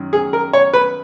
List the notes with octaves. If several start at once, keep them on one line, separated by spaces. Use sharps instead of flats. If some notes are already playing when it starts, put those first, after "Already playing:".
Already playing: F#2 D#3
G#4
A#4
C#5
B4